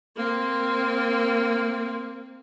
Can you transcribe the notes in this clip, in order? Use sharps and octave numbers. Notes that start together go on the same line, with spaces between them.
A#3 C4